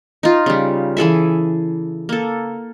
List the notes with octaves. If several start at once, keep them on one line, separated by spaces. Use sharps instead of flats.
D#4 F4
C#3 G3
E3 G#4 A4 E5
A#3 A4